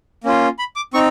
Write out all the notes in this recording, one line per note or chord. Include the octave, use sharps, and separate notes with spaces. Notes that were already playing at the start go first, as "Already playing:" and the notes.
A#3 C#4 F4
B5
D6
C4 D#4 C#6